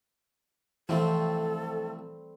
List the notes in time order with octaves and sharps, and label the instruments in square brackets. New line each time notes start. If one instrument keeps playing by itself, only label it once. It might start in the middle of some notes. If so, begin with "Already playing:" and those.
[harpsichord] A2 C3 F3 [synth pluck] E3 [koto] G3 A3 C4 [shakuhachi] A4